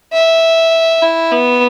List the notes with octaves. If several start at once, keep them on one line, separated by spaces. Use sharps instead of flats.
E5
E4
B3